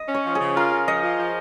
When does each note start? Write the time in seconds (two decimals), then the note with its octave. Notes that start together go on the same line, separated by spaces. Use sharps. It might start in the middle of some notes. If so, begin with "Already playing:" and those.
Already playing: D#5
0.09 C#4
0.14 C#5
0.26 F3
0.35 G#4
0.40 C#3
0.56 F4 A#4
0.72 C#3
0.87 F3 D#5
1.03 F4
1.19 F3